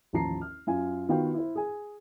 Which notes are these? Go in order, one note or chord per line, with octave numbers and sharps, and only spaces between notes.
A1 D#2 F3 A5 A#5 C7
F6
F#2 F4 G#5
D#3 B3 F4 F#4 F5 G5
E4 C5
G#4 G#5